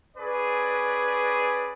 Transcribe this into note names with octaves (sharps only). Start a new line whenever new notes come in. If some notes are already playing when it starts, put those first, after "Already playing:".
C#4 G#4 B4 D5